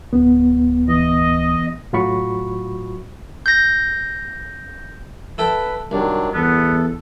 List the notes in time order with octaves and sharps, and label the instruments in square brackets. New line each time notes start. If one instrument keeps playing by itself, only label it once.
[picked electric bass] D1 [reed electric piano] B3
[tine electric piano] E3 [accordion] D#5
[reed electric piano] A2 F#3 F4 F#4 B5 C#6
[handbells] G6 A#6
[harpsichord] E4 A4 G5 [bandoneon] B4
[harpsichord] C2 [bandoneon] D#3 F#3 D4
[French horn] E2 [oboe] B3 [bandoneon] A4